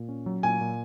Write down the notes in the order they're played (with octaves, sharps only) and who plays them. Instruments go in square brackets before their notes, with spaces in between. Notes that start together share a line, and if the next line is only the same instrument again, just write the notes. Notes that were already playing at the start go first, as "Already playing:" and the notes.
Already playing: [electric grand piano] A#2
C#4
F#3
[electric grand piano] A#2 [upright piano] G#5
[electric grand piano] A#2